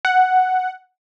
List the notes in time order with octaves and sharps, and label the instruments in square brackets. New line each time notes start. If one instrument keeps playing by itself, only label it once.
[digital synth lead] F#5